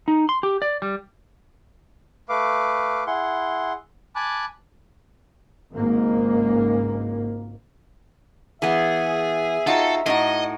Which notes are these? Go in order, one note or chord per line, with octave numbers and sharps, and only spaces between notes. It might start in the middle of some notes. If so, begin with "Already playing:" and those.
D#4
C6
G4
D5
G3
A3 B4 F5 D6
E4 G#4 F#5 C6
G#5 A5 B5 D6 F#6
G#1 C#2 G#2 A#3
E3 B3 G#4 E5
D#4 F4 F#4 A4
A2 D#4 F#4 D#5